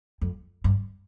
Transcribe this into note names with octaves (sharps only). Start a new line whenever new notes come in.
F2
G2